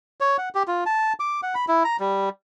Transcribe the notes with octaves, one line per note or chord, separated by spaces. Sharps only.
C#5
F#5
G4
F4
A5
D6
F#5
B5
E4
A#5
G3